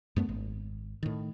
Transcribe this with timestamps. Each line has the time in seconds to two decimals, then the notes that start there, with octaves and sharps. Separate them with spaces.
0.16 F#2 A3 B3
0.29 G#1
1.03 A2 D#3